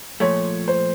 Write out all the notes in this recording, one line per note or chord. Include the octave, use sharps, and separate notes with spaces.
A#2 F3 A3 C#5
C5